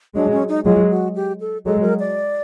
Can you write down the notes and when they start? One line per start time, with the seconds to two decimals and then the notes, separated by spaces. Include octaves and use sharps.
0.15 F#3 G#3 D4
0.32 C#4
0.49 D#4
0.65 F#3 G#3 F4
0.90 F#4
1.15 G4
1.40 A4
1.66 F#3 G#3 A4
1.82 A#4
1.99 D5